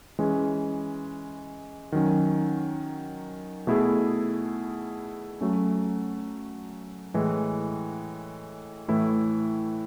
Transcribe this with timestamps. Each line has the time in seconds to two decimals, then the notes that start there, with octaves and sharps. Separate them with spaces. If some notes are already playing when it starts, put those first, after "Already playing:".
0.19 E3 G#3 C#4
1.92 D#3 F#3 C#4
3.67 B2 A3 E4 G#4
5.41 F#3 A3 C#4
7.14 A2 E3 G#3
8.88 A2 E3 A3 E4